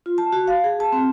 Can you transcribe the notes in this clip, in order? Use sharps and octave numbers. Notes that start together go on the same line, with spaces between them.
F4
A5
F#4
F5
G#4
A5
C4